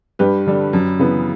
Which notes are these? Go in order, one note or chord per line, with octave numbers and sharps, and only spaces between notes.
G2 G4 B4
D3 G3
F#2
C#3 E3 B3